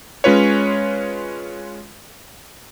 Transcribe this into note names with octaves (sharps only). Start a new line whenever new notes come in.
G#3 C#4 F4 B4 C#5